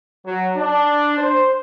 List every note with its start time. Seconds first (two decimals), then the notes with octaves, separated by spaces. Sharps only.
0.25 F#3
0.56 D4
1.18 C5